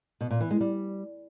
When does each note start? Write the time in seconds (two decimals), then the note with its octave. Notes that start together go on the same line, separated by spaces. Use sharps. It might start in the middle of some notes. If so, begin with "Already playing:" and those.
0.21 B2
0.31 A#2
0.41 E3
0.51 G#3
0.61 G3